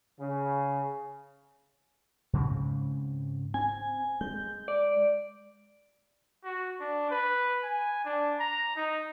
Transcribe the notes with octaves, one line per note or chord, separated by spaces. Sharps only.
C#3
G#2 C#3 C4
C4 G#5
G#3 G6
D5
F#4
D4
B4
G#5
D4
A#5
D#4